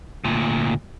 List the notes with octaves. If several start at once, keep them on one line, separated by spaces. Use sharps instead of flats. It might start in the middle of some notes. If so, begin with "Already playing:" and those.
D2 A#2